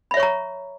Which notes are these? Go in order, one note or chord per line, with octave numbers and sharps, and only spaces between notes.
C#5 E5 A#5 B5 C#6